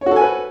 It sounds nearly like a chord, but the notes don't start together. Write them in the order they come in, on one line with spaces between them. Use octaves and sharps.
C#5 F#4 A4 G#5 B4